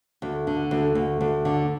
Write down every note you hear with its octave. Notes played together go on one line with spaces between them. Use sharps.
D2
D3
D2
D2
D2
D3